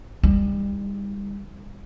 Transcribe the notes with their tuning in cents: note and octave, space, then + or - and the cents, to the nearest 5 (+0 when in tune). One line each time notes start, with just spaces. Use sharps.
G3 +35 D#4 +20